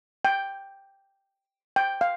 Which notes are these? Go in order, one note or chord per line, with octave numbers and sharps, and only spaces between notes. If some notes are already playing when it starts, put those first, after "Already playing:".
G5
G5
F5